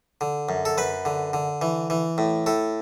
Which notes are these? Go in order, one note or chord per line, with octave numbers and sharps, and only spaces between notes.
D3
F#2
A4
F#2 B4
D3
D3
E3
E3
A2
A2 A4